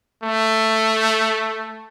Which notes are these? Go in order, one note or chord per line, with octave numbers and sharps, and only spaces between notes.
A3